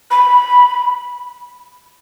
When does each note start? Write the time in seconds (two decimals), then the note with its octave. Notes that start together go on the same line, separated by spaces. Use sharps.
0.11 B5